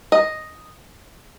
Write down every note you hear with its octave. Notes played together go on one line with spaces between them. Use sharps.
D#5